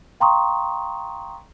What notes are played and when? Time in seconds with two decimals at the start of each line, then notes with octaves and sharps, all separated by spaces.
0.20 F5 G5 A#5 C6 C#6 D#6